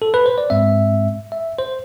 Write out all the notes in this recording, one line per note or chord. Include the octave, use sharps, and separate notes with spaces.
A4
B4
C5
D5
G#2 G#3 C4 E5
E5
C5